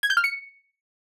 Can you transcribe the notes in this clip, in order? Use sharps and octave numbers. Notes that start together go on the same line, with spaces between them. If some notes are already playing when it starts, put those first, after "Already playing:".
G#6
G6
F6
C#7